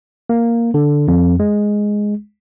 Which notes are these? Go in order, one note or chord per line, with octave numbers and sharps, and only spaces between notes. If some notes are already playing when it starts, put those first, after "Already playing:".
A#3
D3
F2
G#3